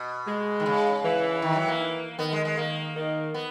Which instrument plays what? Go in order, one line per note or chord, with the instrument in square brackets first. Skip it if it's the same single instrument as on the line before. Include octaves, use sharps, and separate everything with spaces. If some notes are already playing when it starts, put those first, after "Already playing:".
Already playing: [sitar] B2
[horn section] G#3
[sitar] D#3
C#3
[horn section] E3
[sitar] D#3
F#3
A#3
[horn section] D#3 [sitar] B3
[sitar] G#3
G#3
[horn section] D#3 [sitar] A#3
[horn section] D#3
[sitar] B3